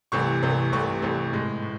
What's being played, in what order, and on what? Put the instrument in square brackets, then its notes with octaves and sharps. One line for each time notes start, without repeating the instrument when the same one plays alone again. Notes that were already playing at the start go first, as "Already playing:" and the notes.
[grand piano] C2 C3 E3 A3 C#6
C2 C3 E3 A3
C2 C3 E3 A3 C#6
C2 C3 E3 A3
A2 G#3
A2